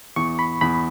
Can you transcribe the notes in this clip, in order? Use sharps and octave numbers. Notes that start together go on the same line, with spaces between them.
E2 C#6
B5
E2 B5